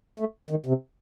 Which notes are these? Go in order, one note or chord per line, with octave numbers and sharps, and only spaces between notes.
A3
D#3
C3